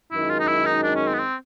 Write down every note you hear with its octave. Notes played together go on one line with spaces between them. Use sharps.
F#2 D#3 G#3 E4
F4
D#4
E4
D#4
D4
C#4
C4
B3
C4